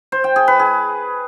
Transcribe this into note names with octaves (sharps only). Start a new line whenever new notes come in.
C5
G5
G#4
B4
G#4